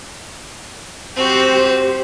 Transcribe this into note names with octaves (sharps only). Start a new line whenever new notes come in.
C4 F#4 G4 C5